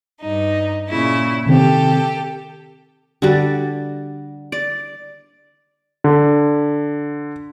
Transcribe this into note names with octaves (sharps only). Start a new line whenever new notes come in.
G2 D#4
A#2 C#3 E4
C3 D#3 C4 G4 A4
D3 G3 F#4 G4 D5
D5
D3